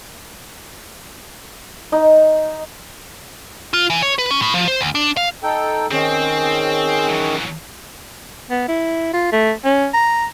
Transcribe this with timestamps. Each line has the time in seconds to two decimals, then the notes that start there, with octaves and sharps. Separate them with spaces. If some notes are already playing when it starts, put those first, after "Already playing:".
1.92 D#4
3.73 F4
3.90 E3
4.02 C#5
4.18 B4
4.31 C#4
4.42 A2
4.54 F3
4.68 C5
4.81 D2
4.95 D4
5.17 F5
5.43 D#4 A4 G5
5.91 D#3 C4 C#4 G#4
7.09 E3 F#3
8.50 B3
8.68 E4
9.13 F4
9.32 A3
9.64 C#4
9.94 A#5